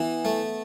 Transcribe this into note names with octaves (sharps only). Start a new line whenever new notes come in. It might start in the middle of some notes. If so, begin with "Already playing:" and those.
Already playing: E3 B3
A3